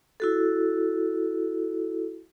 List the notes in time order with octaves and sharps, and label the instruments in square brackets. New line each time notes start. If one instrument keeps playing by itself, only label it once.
[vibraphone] E4 F#4 A4